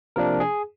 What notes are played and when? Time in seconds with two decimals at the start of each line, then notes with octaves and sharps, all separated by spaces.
0.16 C3 F3 A#3 D4 A#4
0.40 G#4